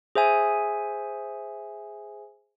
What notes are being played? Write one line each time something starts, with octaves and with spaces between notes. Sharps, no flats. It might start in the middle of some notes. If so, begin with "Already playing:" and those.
G#4 C5 E5 G#5